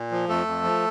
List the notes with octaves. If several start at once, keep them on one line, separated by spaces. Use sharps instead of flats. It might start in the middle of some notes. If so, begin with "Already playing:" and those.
Already playing: A#2
F3
F2 A3 A4
F2
F3